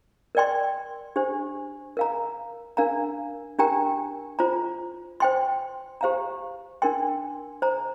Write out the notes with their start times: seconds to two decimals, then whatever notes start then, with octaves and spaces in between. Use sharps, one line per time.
0.35 A#4 D5 G5 C6
1.16 D4 G4 C5
1.97 A#4 F5 A#5
2.77 D4 A#4 F5 A#5
3.59 D4 G4 A#4 G5 A#5
4.39 F4 C5 A#5
5.20 C5 G5 C6
6.01 G4 C5 F5 A#5
6.82 D4 A#4 G5 C6
7.62 C5 A#5